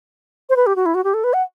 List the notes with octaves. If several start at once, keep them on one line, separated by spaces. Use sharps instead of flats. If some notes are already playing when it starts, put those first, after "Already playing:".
C5
B4
G4
F#4
E4
F#4
G4
A4
B4
F#5